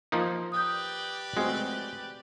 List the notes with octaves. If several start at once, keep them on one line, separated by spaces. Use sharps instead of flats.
F3 A#3 D#4
G4 B4 D5 D#6 G6
G#3 A3 C4 F#4